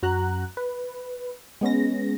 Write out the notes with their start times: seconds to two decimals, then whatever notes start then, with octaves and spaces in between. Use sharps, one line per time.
0.02 F#2 F#4 A#5 F#6
0.57 B4
1.61 G#3 B3 C#4 A#6